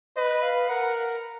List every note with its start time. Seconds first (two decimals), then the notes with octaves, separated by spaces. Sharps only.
0.17 B4 D#5
0.43 F5
0.69 A#4 F#5